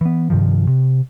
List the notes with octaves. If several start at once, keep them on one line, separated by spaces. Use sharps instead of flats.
E3 B3
G2 C3 D#3 F3
C3